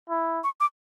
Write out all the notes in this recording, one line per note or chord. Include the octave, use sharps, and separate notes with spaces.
E4
C#6
D6